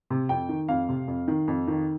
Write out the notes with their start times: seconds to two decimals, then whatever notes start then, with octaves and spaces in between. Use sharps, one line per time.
0.10 C3
0.29 F2 G5
0.49 D#3
0.69 F2 F5
0.89 C3
1.08 F2
1.28 D#3
1.48 F2
1.68 D#3